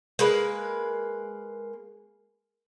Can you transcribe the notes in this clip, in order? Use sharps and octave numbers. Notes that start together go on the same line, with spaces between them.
G#3 A#3 B4